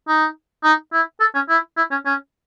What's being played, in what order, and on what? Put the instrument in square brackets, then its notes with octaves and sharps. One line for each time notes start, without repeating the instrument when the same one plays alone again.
[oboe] D#4
D#4
E4
A4
C#4
E4
E4
C#4
C#4